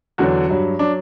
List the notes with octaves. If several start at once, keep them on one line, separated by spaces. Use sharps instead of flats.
E2 D3 F#3 F#4
G2 F#3
F#3 D4